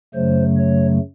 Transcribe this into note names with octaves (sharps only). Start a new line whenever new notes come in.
F#2 C#3 F#3 A3 C5
C#5